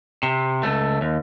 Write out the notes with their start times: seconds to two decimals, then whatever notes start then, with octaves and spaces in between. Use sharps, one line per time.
0.23 C3
0.63 C#2 A3
1.01 D#2